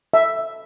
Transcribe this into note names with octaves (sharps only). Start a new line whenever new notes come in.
E5